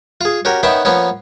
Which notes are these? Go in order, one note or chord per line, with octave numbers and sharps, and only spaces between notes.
F4 G#4
C#4 F#4 G4 A#4
D#3 B3 C#4 E5 F#5 G5
F3 A#3 B3 C#4